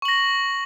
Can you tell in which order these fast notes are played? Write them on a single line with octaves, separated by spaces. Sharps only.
C#6 F#7 A#6